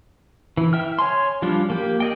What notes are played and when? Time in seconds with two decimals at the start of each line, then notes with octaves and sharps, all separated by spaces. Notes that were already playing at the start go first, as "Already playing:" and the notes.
0.57 E3
0.73 E5 G5 F6
0.99 C#5 G#5 C6
1.42 F3 G3 D4 F4
1.70 A#3 G4
2.00 D5 D#5 G5